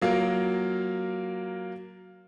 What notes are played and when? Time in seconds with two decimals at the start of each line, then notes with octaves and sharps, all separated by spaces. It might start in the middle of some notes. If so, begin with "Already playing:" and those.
0.02 F#3 A#3 F4 A#4